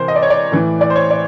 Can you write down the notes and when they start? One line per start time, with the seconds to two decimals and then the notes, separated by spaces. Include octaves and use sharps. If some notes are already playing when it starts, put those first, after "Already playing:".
Already playing: C3 E3 A#4 C5
0.08 D#5
0.16 D5
0.23 C#5
0.30 D5
0.52 A2 E3
0.81 D5
0.90 C5
0.96 C#5
1.11 D5